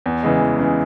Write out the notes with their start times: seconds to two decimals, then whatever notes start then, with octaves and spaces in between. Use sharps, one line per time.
0.06 E2
0.23 C#3 E3 G#3
0.41 E2
0.59 C#3 E3 G#3